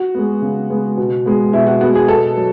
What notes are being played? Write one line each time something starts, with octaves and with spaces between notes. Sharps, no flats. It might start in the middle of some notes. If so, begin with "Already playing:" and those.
Already playing: F#4
G#3 B3
C#3
G#3 B3
B2
G#3 B3
B2 E4
F#4
G#3 B3 F#4
G#4
B2 A4
F#3